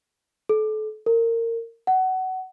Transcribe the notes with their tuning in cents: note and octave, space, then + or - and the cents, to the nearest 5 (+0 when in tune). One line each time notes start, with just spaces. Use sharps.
A4 -30
A#4 -25
F#5 +20